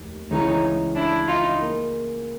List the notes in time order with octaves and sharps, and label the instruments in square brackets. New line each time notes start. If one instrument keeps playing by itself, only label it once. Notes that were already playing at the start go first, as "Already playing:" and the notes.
Already playing: [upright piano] F1 D#2 D#3
[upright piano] C#2 C#3 E3 [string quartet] C#4 D#4
[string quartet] D4 E4
D#4 F4
[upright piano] A#3